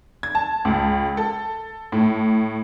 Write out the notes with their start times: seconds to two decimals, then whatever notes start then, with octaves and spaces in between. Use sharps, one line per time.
0.23 G#6
0.35 A5
0.65 C#2
1.17 A4
1.92 A2